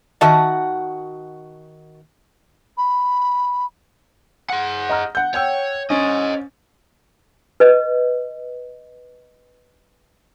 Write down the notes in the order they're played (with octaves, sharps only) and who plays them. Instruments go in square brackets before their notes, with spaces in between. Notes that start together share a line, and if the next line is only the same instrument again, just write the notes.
[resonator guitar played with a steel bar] D#3 F#4 F#5 [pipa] D#5 E5 A5
[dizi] B5
[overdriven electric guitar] G#4 F#5
[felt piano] D#5 A#5 F6
F#5 G6
[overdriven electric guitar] C#5 [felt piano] F#5 G5 E6
[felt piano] C#4 [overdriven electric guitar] C5 D#5
[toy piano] B4 D#5